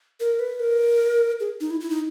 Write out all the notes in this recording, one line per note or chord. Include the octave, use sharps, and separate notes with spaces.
A#4
B4
A#4
G#4
D#4
E4
E4
D#4